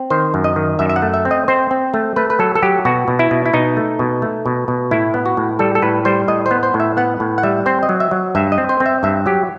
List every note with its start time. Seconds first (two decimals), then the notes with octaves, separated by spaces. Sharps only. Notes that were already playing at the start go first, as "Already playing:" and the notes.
Already playing: C4
0.10 D#3 C5
0.34 F#2
0.44 D#5
0.56 D#3
0.79 F#2 E5
0.89 E5
0.96 F#5
1.02 A3
1.14 E5
1.25 C4
1.31 D#5
1.48 C4 C5
1.71 C4
1.94 A3
2.16 A3 B4
2.30 B4
2.39 F#3 A4
2.55 A4
2.62 F#3 G4
2.85 B2 F#4
3.08 B2
3.19 E4
3.31 B2
3.46 E4
3.53 B2 D#4
3.77 A3
3.99 B2
4.22 A3
4.46 B2
4.68 B2
4.91 A2 E4
5.14 B3
5.26 F#4
5.37 A2
5.59 G3 A4
5.75 A4
5.82 A2 B4
6.05 G3 C5
6.28 A2 D#5
6.46 C5
6.51 B3
6.63 C5
6.74 A2
6.80 E5
6.97 B3 F#5
7.20 A2
7.38 F#5
7.43 G3 E5
7.66 C4 C5
7.83 D#5
7.89 F#3
8.00 E5
8.11 F#3
8.35 G2 E5
8.52 D#5
8.58 C4
8.69 C5
8.80 C4
8.86 E5
9.03 G2 E5
9.26 F#3 G4